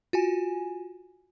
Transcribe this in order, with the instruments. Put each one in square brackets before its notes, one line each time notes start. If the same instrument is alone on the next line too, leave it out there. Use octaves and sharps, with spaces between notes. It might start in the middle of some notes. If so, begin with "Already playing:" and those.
[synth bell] F4 F#4 G#5